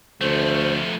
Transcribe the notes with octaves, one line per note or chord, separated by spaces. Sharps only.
D2 F3 A3 C5